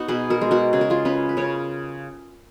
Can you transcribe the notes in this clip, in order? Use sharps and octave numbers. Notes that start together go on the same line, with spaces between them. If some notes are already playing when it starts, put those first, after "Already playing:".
Already playing: B3 D#4 F#4
B2 G#4 B4
F#4 A#4
G#3
F#4 A#4
C#3 G#4
A#4
F4 G#4
C#4 G#4 B4
B4
C#3 A#4 C#5